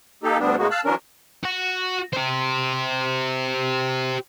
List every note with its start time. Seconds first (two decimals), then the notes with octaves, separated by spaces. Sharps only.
0.23 A#3 D#4 G4 A4
0.39 D2 G3 B3 C4 D4
0.58 A2 C#3 G#3 A#3 B3 F#4
0.71 F5 A5 E6 F#6
0.85 E3 F#3 C#4 D4 A#4
1.43 F#4 F#5
2.13 G4 C5